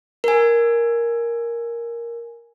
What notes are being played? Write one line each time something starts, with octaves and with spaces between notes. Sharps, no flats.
A#4 G#5